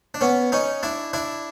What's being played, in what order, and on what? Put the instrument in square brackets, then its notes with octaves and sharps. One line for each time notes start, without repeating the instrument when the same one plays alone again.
[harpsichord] D4
B3 C#4
C#4 D#4
D4 E4
D4 E4